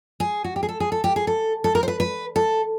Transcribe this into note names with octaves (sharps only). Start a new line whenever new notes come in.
G#4
F#4
G4
G#4
A4
G#4
A4
G4
G#4
A4
A4
A#4
C5
B4
B4
A4